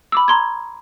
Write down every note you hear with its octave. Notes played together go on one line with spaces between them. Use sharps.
B5 D6 E6
A#5 C6 G#6